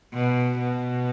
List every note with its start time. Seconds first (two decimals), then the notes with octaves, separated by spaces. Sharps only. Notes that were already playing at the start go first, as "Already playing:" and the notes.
0.13 B2
0.58 B2